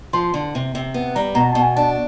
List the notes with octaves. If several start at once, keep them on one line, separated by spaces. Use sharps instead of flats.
F3 C6
D3
C3
C3
B3
G3 A#5
B2 A#5
A5
B2
G#5
D4 A5